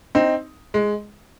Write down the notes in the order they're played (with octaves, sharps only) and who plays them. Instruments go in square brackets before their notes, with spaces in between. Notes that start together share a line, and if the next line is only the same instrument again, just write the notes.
[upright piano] C4 D#4
G#3